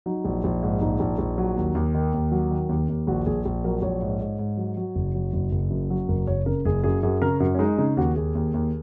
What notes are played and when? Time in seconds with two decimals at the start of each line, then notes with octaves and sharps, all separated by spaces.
0.06 F#3 D#4
0.25 A#1
0.44 A#1
0.63 G#2
0.81 A#1 D#4
1.00 A#1
1.19 A#1
1.38 F#3
1.57 D#2
1.75 D#2
1.95 D#3
2.14 D#2
2.32 F#3
2.51 D#3
2.69 D#2
2.89 D#2
3.07 A#1 F#4
3.26 A#1 G#4
3.46 A#1
3.64 F#3 A#4
3.82 A#1 C#5
4.02 G#2
4.21 G#2
4.39 G#2
4.57 F#3
4.77 F#3
4.95 F#1
5.15 F#3
5.33 F#1
5.52 F#1
5.70 F#2
5.90 F#3
6.08 F#1 A#4
6.27 F#1 C#5
6.46 C#3 A#4
6.65 F#1 G#4
6.84 F#2 G#4
7.03 F#2 G#4
7.22 C#3 A#4
7.40 F#2
7.55 C#4
7.59 G#3 D#4
7.78 C#3 D#4
7.97 D#2 F#4
8.16 D#2 G#4
8.35 D#2
8.54 D#2